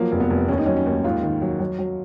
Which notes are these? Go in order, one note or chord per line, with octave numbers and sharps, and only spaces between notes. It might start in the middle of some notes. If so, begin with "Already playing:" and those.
Already playing: F3 F#3 A#3
F1
B3
F1
D#2 C#4
D#4
F#3 C#4
C#4
D#2
G#2 F4
D#3
F#3
F#3
F#3